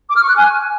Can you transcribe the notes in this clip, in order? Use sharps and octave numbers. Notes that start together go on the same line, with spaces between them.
D6
F6
C#6
F#6
G#5